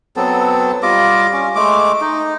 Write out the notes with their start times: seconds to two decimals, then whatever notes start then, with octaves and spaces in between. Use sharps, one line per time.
0.16 F#3 B3 C4 A4
0.83 G3 F4 D#5 D6
1.33 C#4
1.56 G#3 A3 D6
2.01 D#4